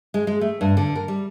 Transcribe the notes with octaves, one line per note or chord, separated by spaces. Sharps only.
G#3
G#3
A3
G2
D3
A#4
G3